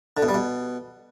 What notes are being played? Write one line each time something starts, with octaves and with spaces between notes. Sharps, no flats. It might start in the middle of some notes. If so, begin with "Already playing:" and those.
D3
B2
G3
B2